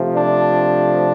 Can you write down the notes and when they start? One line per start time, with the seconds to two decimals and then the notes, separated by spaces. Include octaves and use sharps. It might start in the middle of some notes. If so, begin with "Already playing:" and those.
Already playing: C3 F3 A3
0.16 D4